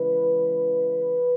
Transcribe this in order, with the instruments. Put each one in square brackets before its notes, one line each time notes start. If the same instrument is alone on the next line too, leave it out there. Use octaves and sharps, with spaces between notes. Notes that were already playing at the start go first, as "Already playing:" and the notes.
Already playing: [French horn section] C#3 E3 G#3 B4